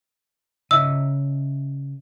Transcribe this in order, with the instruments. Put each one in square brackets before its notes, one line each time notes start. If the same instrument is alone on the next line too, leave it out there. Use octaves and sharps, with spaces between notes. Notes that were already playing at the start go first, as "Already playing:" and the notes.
[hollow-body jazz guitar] C#3 D#5 E5 [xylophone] E6